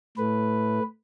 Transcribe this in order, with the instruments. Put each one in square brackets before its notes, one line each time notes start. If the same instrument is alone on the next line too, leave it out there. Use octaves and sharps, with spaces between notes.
[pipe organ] A2 A3 B4